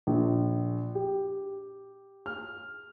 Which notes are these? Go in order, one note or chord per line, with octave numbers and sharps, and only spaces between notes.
A#1
G4
F6